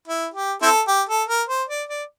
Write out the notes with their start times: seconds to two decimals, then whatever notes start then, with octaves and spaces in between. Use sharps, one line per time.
0.08 E4
0.34 G4
0.62 C4 E4 A4
0.88 G4
1.09 A4
1.29 A#4
1.49 C5
1.69 D5
1.89 D5